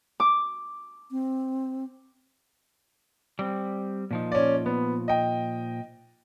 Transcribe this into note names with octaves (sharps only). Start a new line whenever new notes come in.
D6
C4
G3 C4
A#2 F3 D#4
C#4 D5
B3
D#5 G5